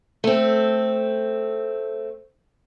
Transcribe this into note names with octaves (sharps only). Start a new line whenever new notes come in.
A3 C4